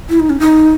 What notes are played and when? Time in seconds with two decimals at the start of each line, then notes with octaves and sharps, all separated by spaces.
0.09 E4
0.20 D#4
0.30 C#4
0.40 D#4